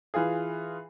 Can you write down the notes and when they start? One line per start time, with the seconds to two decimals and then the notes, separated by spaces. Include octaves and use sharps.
0.14 E3 F4 G#4